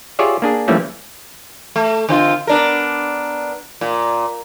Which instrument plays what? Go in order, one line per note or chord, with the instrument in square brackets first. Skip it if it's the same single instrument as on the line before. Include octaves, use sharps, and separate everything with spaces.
[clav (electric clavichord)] F4 G4 G#4 C#5 D5 E5
A#3 D4 G#4
E3 F3 G3 A3 A#3 C#4
[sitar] A3
D3 C4 F4
B3 D4 A#4
A#2